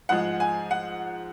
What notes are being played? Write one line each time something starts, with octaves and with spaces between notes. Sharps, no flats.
G#2 F3 G#3 F#5
G#5
F#5